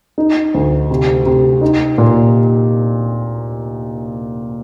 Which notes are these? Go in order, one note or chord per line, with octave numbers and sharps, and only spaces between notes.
D#4
D2
C3
C3
D#4
A#2